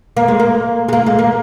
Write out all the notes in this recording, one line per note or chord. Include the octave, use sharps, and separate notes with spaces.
A#3
G#3
A#3
G#3
A#3
G#3
A#3